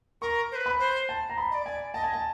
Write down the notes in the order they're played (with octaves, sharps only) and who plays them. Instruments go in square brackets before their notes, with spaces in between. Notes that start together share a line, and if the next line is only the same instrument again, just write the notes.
[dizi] A#4 [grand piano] C#6
[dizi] C5
B4
[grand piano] B5
[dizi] C5
[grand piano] A5
A#5
B5
[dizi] D#5
D5
[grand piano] G#5
[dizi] D#5 [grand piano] A5
[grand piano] G#5
A5